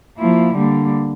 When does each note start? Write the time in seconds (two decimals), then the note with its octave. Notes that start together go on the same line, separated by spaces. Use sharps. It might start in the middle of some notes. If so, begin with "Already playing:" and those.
0.18 F3 A#3 E4
0.55 D3 G3 A#3